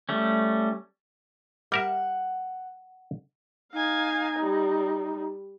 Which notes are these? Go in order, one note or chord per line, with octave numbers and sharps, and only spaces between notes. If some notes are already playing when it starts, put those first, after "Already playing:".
G3 A3 C#4
G3 A#4 E5 F#5
D#4 F5 G#5
G3